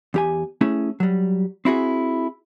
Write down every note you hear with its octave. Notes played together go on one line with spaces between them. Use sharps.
E2 G4 G#5
A3 C#4 E4 G#4
F#3 G3
C4 E4 F#4 G#4